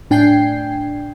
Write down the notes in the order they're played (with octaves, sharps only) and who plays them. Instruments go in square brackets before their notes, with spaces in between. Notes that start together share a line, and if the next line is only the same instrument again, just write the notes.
[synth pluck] A2 D4 G5 G#5 G6 C7